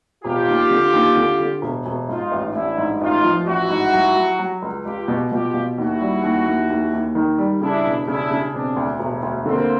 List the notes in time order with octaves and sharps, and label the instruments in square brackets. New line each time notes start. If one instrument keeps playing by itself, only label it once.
[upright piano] E1 [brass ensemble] F4 G4
[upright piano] D#2
D3
D#2
D3
D3
E1
E1
[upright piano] G#2 [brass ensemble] D#4 F4
[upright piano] A1
[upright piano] A1 [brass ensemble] D4 E4
[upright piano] G#2
[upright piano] A1 [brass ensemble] D#4 F4
[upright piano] F3
[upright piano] A1 [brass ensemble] E4 F#4
[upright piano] G#2
F#3
F#3
F#3
C#2
[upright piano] C#2 [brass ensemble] F4 G4
[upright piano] B2
[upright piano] B2 [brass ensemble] F4 G4
[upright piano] B2
[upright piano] D#2 [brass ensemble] E4 F#4
[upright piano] G3
D#2
D#2
D#2
D#2
D#3
G3
[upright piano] C#3 [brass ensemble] D4 E4
[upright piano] E1
[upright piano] C#3 [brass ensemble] D4 E4
[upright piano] C#3
[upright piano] E1 [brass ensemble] C4 D4
[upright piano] D2
E1
D2
[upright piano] D3 [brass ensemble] A#3 C4